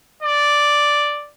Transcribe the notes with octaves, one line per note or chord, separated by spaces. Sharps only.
D5